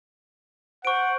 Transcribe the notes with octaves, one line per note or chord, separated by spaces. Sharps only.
C5 F#5 C#6 D7